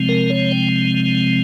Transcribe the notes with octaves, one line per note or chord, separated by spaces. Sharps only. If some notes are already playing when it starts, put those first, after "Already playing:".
Already playing: C3 F3 G#3 C4
A#4
C#5
G5